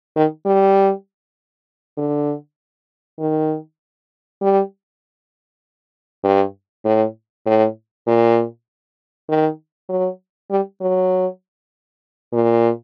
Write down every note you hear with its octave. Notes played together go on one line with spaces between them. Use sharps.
D#3
G3
D3
D#3
G3
G2
A2
A2
A#2
D#3
F#3
G3
F#3
A#2